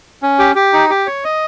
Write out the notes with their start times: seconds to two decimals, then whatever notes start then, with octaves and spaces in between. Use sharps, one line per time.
0.22 C#4
0.39 G4
0.56 G4
0.73 D#4
0.90 G4
1.07 C#5
1.24 D#5